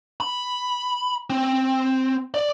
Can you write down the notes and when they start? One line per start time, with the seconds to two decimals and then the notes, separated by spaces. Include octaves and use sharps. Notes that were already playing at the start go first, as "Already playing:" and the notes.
0.20 B5
1.30 C4
2.34 D5